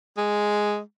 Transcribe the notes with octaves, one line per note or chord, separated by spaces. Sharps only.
G#3